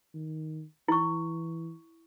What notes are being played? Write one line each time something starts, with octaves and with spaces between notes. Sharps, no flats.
D#3
E3 E4 C#6